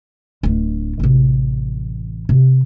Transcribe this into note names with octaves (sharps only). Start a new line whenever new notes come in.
D1 D4
A1 C3
C3